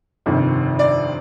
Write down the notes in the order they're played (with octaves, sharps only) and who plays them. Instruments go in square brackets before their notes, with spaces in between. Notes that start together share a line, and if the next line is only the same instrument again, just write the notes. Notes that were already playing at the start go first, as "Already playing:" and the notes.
[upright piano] G1 F2 C3 D#3
D5